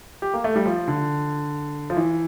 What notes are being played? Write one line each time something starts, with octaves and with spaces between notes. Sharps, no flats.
G4
A#3
A3
G3
F3
D3
F3
E3